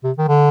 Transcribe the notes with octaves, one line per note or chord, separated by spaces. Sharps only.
C3
D#3
D3